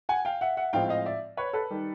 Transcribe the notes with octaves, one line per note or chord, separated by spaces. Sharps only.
F#5 G#5
F5 G5
E5 F#5
E5 F#5
A2 F3 G#3 C4 F5 G5
D#5 F5
D5 E5
B4 C#5
A4 B4
D#3 G3